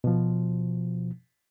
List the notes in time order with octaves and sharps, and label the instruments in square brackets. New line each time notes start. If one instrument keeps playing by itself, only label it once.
[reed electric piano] B2 F3